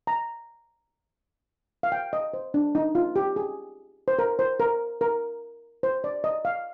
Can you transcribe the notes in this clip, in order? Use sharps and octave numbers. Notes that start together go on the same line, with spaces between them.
A#5
F5
G5
D#5
C5
D4
D#4
F4
G4
G#4
C5
A#4
C5
A#4
A#4
C5
D5
D#5
F5